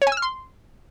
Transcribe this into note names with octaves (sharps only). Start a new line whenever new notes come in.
C#5
G#5
E6
F6
C6